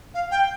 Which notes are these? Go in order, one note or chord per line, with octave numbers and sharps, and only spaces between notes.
F5
G5